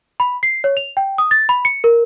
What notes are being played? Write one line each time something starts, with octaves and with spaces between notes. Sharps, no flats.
B5
C7
C#5
F7
G5
D#6
A6
B5
C#7
A#4